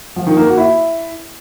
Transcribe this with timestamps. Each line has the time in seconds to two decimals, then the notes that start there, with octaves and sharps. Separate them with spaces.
0.16 F3
0.27 D#3
0.37 A#3
0.47 F#4
0.58 E4